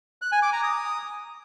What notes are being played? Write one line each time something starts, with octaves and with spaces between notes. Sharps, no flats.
F#6
G#5
D6
A#5
D#6